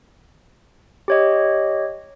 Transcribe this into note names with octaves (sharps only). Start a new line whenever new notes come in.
G4 C#5 D#5